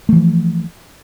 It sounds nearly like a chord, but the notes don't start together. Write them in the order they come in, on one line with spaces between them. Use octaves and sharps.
A3 E3 F3